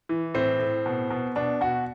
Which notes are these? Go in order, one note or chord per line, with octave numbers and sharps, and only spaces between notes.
E3
A2 C4
A2
B2
B2
B2 D4
B2 F#4